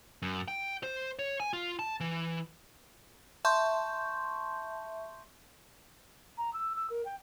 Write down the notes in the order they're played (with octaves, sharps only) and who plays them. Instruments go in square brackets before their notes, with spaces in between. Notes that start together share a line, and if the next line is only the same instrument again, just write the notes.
[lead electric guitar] F#2
G5
C5
C#5
G#5
F4
A5
E3
[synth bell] E5 A5 C6 C#6 G6
[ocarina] A#5
E6
E6
A#4
G5